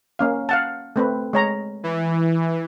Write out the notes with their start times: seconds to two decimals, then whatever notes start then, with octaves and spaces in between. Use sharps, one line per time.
0.19 A#3 C#4 F5
0.49 F5 F#5 A5
0.96 A3 C4 B4
1.33 G#3 C#5 A#5
1.84 E3